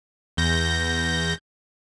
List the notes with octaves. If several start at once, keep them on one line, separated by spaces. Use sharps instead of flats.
E2 G6 A#6